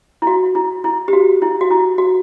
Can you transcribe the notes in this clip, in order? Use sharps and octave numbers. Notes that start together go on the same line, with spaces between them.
E4
F#4
E4
E4
G4
F#4
E4
F#4
E4
F#4